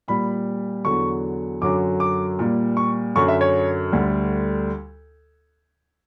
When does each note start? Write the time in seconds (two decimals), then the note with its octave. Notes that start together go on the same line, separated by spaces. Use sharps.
0.08 A#2 G3 B5
0.85 E2 D3 F#3 C#6
1.61 F#2 D3 F#3 D6
2.00 D6
2.39 A#2 G3
2.77 C#6
3.16 F#2 D3 F#3 C#6
3.28 E5
3.41 C#5
3.92 D2 D3 G3